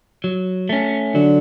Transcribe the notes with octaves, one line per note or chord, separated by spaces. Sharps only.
F#3
A3 C#4
D3 F#3